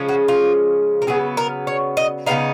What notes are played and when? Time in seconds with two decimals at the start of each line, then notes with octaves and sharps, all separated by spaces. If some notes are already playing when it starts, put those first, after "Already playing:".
Already playing: C#3 F3 G#3 C#4
0.09 F#4
0.28 F4
1.02 A#4
1.07 C#3 F#3 B3 G#4
1.37 A#4
1.67 C#5
1.97 D#5
2.26 C#3 F#3 B3 D#4 F5